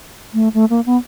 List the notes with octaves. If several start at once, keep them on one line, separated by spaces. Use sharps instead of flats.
A3
A3
A#3
B3